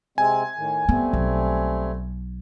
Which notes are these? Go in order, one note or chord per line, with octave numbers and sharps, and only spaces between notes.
C3 G#3 C4 G#5
A2 D#3
G3 A3 B3 C4
B1